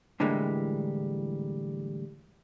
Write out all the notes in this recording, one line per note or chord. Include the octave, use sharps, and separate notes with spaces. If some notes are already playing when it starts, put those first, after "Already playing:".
A2 D3 E3 G3 G#3 A#3